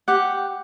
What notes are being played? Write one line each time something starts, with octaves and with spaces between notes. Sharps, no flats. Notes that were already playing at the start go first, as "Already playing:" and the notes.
G4 F#5